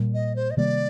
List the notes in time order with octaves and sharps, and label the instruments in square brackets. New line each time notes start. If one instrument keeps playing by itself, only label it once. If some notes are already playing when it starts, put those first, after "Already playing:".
Already playing: [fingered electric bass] A#2 G3 A#3
[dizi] D#5
C5
D#5
[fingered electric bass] C3 D#3 G3 A#3 [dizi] D5